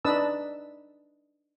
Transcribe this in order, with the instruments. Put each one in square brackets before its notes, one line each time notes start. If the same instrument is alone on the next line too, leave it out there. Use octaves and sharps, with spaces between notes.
[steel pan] D4 D#4 B4 D#5 A5 E6